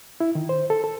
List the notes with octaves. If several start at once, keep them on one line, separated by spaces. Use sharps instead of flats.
E4
D#3
C5
A4
A4